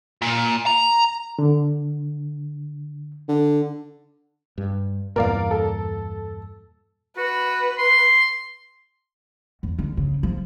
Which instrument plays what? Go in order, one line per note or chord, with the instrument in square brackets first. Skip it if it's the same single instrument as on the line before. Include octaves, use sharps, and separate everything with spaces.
[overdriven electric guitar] A#2
A#5
[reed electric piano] D3
[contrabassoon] D3
[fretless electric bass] G2
[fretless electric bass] E2 G2 A#2 [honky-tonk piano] A#4 D5 F5
[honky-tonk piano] A4
[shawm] F#4 [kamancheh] B4
[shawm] C6
[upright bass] E2
D3
C#3
F3